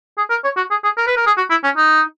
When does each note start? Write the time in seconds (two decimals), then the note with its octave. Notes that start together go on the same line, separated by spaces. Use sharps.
0.18 G#4
0.30 A#4
0.44 C#5
0.57 F#4
0.71 G#4
0.84 G#4
0.97 A#4
1.07 B4
1.17 A#4
1.26 G#4
1.38 F#4
1.50 E4
1.64 C#4
1.77 D#4